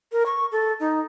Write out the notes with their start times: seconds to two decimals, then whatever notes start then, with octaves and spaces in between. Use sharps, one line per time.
0.12 A#4
0.26 C#6
0.52 A4
0.80 D#4